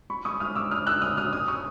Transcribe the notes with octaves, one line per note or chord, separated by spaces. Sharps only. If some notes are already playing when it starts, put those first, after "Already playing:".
B5 C#6
C#6 D#6
D#6 F6
D6 E6
D#6 F6
E6 F#6
D#6 F6
D#6 F6
D#6 F6
C#6 D#6